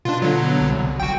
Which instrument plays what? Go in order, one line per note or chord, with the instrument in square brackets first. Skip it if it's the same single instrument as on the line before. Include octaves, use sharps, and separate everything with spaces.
[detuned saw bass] B2 [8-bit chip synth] D4 F4
[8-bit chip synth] D3 F#3
[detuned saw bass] C2
[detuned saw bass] G1 [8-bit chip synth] F#4 G5